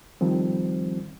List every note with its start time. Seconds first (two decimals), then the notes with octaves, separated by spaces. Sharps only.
0.21 D#3 F3 G3 C4